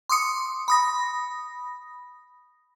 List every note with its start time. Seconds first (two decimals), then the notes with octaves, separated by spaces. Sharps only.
0.09 C6 D6 D#6 C#7
0.68 B5 D#6 A#6